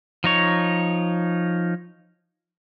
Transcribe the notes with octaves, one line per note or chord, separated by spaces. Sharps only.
F3 D#4 C#5